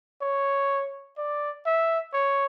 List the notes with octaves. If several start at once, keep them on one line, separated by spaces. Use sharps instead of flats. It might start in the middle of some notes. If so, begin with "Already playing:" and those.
C#5
D5
E5
C#5